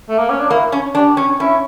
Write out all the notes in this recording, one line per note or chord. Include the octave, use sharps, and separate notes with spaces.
A3
A#3
C#4
D4
A#3 E4
C#4
D4 G4
C#4
C#4 E4